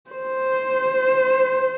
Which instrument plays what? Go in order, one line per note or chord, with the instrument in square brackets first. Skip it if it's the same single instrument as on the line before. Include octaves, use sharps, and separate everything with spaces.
[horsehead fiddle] C5